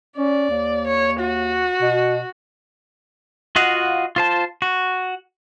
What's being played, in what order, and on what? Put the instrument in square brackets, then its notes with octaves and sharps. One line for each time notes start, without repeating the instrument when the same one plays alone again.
[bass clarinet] C#4 [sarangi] D5
[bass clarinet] D#2
[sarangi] C#5
F#4
[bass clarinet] B2
[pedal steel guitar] F4 F#4 D#5 F5 F#5
F4 C5 A5
F#4